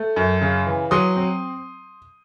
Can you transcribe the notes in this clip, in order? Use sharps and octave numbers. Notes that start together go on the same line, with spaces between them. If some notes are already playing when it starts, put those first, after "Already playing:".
Already playing: A3
F#2
C#3
E3
F#3 C6 D#6
C4